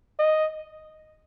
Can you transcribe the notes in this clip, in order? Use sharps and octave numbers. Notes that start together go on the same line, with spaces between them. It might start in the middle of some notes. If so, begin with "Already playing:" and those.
D#5